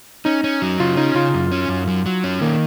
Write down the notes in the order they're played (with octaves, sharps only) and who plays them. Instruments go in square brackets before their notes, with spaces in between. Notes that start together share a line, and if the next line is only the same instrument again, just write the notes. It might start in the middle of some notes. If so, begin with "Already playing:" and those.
[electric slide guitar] C#4 [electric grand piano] D#4
[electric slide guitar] C#4
F#3
[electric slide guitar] C#3 [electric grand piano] F4
[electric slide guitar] C#4 [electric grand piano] D#4
[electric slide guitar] C#3 [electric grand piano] F4
[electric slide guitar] F#2
C#4
F#2
F#3
F#3
C#4
[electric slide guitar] D#3 [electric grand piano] A#3